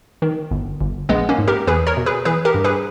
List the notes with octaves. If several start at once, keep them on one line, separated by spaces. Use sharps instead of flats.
D#3
G1
G1
A#1 G#3 B3
A#3 C#4
G#2
G4 A#4
E2 G#4 B4
A#4 C#5
B2
G#4 B4
E3 G#4 B4
G4 A#4
G2
G#4 B4